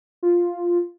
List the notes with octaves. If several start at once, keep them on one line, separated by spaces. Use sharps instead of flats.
F4